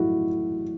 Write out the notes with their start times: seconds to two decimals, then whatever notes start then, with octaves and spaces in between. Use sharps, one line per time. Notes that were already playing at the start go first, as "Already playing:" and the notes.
Already playing: A2 F#3 A3 E4 F#4